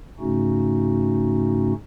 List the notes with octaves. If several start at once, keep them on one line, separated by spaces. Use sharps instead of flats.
G#2 C#3 A3 C#4 D#4 F#4